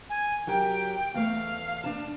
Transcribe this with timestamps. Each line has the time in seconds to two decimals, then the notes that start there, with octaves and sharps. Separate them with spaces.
0.10 G#5
0.47 F#3 G4 A#4 G5
1.14 E2 A3 F5
1.84 D4 A5